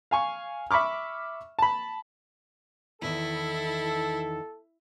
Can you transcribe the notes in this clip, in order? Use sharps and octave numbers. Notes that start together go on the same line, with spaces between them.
F5 G#5 C#6
E5 B5 C#6 D6 F6
A5 B5
E2 D#3 E4 A4